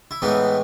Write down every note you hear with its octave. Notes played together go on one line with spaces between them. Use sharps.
E4
A2 E3 G#3 B3 D#4